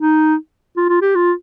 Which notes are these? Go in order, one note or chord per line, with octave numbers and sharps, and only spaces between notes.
D#4
F4
F4
G4
F4